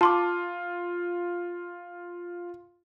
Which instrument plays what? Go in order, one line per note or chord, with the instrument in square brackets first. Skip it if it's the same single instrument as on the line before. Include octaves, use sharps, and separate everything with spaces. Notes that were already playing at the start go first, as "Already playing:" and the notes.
[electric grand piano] F4 [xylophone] A5 C6 D6